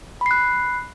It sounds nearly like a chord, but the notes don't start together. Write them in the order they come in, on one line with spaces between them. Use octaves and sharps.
B5 C7 F#6